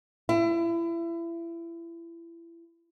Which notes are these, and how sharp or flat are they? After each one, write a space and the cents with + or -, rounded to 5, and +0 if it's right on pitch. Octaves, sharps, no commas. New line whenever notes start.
E4 +30